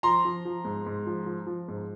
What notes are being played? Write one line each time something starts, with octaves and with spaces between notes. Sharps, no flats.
F3 A#5 C6
F3
F3
G#2
G#2
F3
F3
F3
G#2